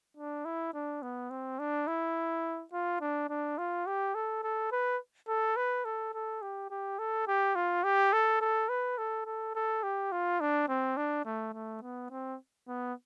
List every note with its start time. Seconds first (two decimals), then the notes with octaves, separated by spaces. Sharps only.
0.17 D4
0.45 E4
0.74 D4
1.02 B3
1.30 C4
1.59 D4
1.87 E4
2.73 F4
3.01 D4
3.29 D4
3.58 F4
3.87 G4
4.15 A4
4.43 A4
4.72 B4
5.28 A4
5.56 B4
5.85 A4
6.14 A4
6.42 G4
6.70 G4
6.99 A4
7.27 G4
7.55 F4
7.84 G4
8.13 A4
8.41 A4
8.69 B4
8.98 A4
9.26 A4
9.55 A4
9.83 G4
10.12 F4
10.40 D4
10.68 C4
10.97 D4
11.25 A3
11.53 A3
11.82 B3
12.10 C4
12.68 B3